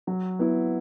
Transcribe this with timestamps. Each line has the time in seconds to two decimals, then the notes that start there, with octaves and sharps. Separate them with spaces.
0.07 F#3
0.39 B3 E4